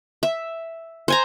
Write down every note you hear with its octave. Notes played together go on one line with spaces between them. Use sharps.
E5
C5 G#5 A#5